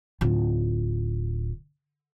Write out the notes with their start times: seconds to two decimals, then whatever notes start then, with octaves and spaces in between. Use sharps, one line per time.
0.21 D1 F4